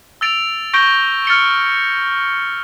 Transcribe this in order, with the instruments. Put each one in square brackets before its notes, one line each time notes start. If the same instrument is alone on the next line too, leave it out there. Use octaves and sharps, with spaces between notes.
[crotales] E6 A6 D7 F7
C#6 G6 A#6 D7 G7
F6 A6 C#7 G7